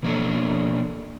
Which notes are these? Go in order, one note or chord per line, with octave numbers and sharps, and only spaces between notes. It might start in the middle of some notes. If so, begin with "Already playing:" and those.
B2 F3 A#3 C#4 D4 A4